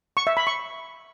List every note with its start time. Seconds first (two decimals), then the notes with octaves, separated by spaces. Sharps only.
0.17 C#6
0.27 E5
0.37 B5
0.47 C#6